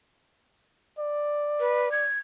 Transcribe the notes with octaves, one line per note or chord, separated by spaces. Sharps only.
D5
B4
G#6